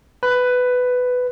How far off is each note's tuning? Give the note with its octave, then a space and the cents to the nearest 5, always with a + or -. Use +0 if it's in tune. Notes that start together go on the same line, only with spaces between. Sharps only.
B4 +10